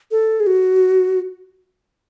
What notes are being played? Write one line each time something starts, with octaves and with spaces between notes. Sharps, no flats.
A4
G#4
F#4